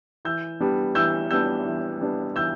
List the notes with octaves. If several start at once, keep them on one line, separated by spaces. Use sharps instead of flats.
E3 E6 G6
G3 B3 D4
E3 E6 G6
G3 B3 D4 E6 G6
E3
G3 B3 D4
E3 E6 G6